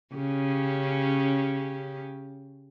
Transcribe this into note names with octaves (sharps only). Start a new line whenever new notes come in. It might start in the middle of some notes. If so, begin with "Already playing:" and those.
C#3 C#4 G4